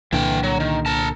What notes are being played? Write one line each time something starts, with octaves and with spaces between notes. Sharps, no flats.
C2 A#2 D3 E3 G5
F#3
D#3
A#4 A5